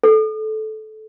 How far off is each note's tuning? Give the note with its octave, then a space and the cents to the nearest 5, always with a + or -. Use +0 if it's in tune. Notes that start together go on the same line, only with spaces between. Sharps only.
A4 -20